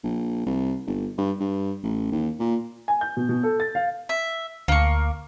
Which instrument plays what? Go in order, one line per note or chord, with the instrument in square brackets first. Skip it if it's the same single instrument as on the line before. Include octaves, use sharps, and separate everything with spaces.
[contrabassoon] A#1
C2
G1
G2
G2
A1
D#2
A#2
[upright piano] G#5
G6
B2
B2
A4
A6
F5
[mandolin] E5
[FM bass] D2 [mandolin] A#3 C#6